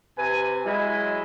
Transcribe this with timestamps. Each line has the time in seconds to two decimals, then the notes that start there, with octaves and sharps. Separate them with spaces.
0.18 C3 B4 G#5
0.66 F#3 G#3 E4